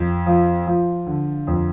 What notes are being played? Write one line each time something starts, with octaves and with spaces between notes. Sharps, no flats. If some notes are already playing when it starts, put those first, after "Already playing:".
Already playing: F2
F3
F3
D3
F2